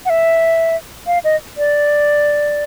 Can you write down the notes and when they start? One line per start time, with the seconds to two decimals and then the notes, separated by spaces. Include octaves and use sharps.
0.05 F#5
0.10 E5
1.07 F5
1.24 D#5
1.58 D5